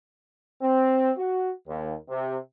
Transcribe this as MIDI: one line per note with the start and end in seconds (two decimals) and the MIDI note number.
0.62 1.11 60
1.17 1.50 66
1.67 1.94 39
2.08 2.36 48